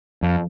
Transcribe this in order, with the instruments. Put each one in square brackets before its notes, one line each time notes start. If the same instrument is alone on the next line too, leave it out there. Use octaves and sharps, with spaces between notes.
[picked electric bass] F2